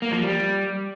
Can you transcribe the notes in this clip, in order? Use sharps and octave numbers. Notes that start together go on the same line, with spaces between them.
A#3
F3
G3